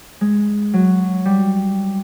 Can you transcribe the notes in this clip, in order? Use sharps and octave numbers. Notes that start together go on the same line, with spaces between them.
G#3
F#3
G3